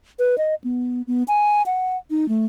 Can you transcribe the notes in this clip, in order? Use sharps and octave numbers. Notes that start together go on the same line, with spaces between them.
B4
D#5
B3
B3
G#5
F#5
D#4
A3